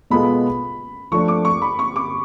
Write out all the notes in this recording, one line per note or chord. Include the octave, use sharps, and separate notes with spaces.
B2 G#3 B3 F4 A4 B5
F3 A3 D4 C#6
D6
C#6
B5
C#6
D6